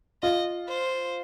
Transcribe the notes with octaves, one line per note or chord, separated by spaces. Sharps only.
F4 D#5
C5